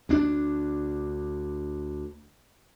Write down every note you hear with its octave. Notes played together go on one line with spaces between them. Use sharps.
D2 D4